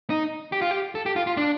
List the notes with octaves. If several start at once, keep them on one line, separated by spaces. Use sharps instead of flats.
D#4
G4
F4
G4
A4
G4
F4
F4
D4